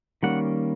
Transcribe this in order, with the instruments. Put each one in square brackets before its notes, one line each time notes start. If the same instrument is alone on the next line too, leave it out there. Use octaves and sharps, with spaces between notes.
[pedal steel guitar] D#3 G3 A#3 C#4 F#5